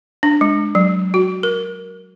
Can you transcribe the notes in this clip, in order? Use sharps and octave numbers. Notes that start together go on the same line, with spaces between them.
D4
G#3
F#3
F#4
A#4